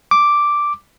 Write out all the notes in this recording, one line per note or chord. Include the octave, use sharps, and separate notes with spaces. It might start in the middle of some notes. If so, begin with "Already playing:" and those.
D6